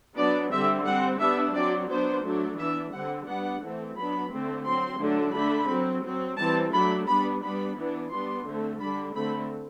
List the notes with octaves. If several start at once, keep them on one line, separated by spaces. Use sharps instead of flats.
F#3 B3 D4 D5
D3 G3 C4 E5
G3 C4 F#5
G3 B3 D4 E5
F#3 C4 D5
F#3 B3 D4 C5
F#3 A3 D4
E3 B3 D4 E5
D3 G3 C4 F#5
G3 B3 D4 F#5
E3 A3 C4
F#3 B3 D4 B5
D3 A3 C4
F#3 C4 C6
D3 F#3 A3 D4
D3 A3 D4 B5
F#3 C4
F#3 C4
E3 G3 C4 A5
F#3 A3 D4 B5
G3 B3 D4 B5
G3 B3 D4 B5
E3 B3 D4
G3 B3 D4 C6
D3 A3 C4
D3 G3 D4 B5
D3 A3 C4 B5